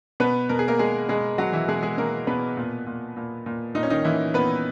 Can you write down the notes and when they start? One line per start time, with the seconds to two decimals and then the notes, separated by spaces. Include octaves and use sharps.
0.20 B2 B3 B4
0.49 B2 A#4
0.59 G#4
0.68 A#3 A#4
0.79 B2 G#3 G#4
1.09 B2 G#3 G#4
1.38 B2 F#3 F#4
1.53 E3 E4
1.68 B2 G#3 G#4
1.83 G#3 G#4
1.98 B2 A#3 A#4
2.27 B2 B3 B4
2.57 A#2
2.86 A#2
3.17 A#2
3.46 A#2
3.75 A#2 D#4
3.83 C#4
3.90 D#3 D#4
4.04 A#2 E3 E4
4.34 A#2 B3 B4